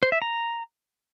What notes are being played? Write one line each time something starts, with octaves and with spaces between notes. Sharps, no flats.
C5
E5
A#5